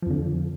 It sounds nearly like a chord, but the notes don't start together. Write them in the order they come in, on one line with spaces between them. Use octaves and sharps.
F3 F2 D3